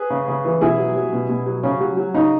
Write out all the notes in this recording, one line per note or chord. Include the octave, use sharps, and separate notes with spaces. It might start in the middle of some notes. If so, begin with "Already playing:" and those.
Already playing: G#4 B4
C#3
C#3
E3
B2 E4 G#4
F#3
F#3
B2
B2
F#3
C#3 C#4
F#3
F#3
C#3 D#4